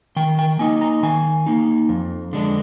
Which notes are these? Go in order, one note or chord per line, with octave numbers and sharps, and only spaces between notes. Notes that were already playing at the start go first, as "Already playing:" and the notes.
D#3 G5
G5
A#3 D#4 G#5
A#5
D#3 G#5
A#3 D#4
F2
D3 G#3 D4